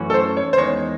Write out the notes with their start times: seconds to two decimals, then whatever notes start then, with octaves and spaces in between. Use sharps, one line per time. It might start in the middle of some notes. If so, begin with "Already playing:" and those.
Already playing: F#2 E3 A3 C#4 F#4
0.10 A4
0.14 C5
0.37 C#5
0.53 C5
0.58 E2 D#3 G#3 C#5